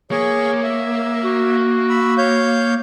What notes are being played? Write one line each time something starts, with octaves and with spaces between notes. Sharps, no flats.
A#3 G#4 C#5 C#6
E5
F#4
B5 E6
C#5 F5 G6